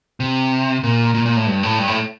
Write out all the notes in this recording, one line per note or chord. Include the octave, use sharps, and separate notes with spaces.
C3
A#2
A#2
A#2
A2
G2
A2
G2
A2